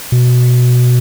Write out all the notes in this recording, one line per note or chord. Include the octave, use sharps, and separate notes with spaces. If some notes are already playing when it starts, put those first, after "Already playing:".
B2